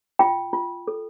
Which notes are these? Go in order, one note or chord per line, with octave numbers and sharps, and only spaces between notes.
F4 G5
F4
A4